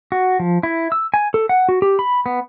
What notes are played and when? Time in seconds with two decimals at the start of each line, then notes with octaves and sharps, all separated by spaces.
0.12 F#4
0.40 F3
0.63 E4
0.92 E6
1.14 G#5
1.34 A4
1.49 F#5
1.69 F#4
1.82 G4
1.99 B5
2.26 B3